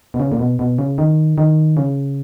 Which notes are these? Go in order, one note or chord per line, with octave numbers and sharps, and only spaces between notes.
B2
C#3
A#2
B2
B2
C#3
D#3
D#3
C#3